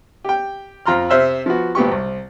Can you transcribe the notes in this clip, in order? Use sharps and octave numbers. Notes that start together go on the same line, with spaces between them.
G4 G5
F2 F4 A#5 C6 F6
C3 C5 E5 E6 F6
F3 B3 F#4
G#1 A#2 B3 G4 C#6
C2